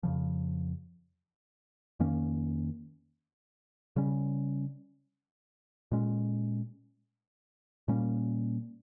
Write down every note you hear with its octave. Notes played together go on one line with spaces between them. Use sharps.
F2 C#3 F3
F2 D#3 A#3 C#4
C#3 G3 C#4
A#2 G#3 C#4
A#2 G3 A#3 C#4